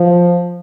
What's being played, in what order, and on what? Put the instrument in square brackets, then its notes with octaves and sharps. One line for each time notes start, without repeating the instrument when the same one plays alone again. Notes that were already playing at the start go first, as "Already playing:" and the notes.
Already playing: [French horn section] F3